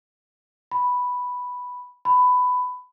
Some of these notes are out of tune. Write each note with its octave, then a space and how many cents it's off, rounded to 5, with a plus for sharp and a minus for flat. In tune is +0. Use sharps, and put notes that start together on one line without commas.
B5 +0
B5 +15